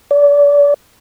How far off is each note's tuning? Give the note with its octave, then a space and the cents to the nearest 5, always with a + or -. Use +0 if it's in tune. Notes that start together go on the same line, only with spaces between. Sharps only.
D5 -35